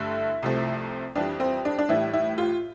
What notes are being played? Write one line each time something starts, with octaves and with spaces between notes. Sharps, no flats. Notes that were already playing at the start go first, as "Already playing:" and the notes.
Already playing: G2 D3 A3 E4
C2 C3 F3 A3
F2 E3 G3 D4
C4
D4
D4
A2 E3 G3 E4
E4
F4